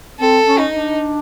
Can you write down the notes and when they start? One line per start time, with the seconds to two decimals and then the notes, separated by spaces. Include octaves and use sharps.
0.20 C4 A4
0.46 C#4
0.59 D#4
0.73 D4